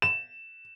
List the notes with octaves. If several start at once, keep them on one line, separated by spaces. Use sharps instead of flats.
E7